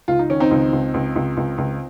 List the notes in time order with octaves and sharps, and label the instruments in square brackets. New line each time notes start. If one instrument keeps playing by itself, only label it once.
[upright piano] C#2 F4
D#4
D#3 C#4
C4 D#4
C#2
C#2
C#2
C#2
C#2
C#2